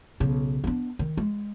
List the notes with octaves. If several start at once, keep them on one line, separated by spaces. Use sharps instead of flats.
B1 C#3
B3 D4
D#3
G#3